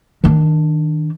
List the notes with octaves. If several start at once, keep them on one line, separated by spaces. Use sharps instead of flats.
D#3 D4